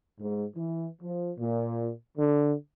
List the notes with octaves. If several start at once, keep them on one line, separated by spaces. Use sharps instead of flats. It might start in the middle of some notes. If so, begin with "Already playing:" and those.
G#2
E3
F3
A#2
D3